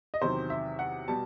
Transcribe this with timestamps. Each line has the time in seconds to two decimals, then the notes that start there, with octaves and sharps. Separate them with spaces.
0.14 D#5
0.21 E2 C3 D#3 F#3 C5
0.50 E5
0.79 F#5
1.08 B2 G3 A5